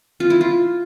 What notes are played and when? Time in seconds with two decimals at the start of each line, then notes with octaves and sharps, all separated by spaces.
0.20 F4
0.30 E4
0.41 F4